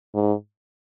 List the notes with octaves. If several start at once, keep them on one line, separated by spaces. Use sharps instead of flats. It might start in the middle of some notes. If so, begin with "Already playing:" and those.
G#2